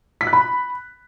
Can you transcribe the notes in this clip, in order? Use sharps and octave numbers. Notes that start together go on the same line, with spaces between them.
B6
F#6
B5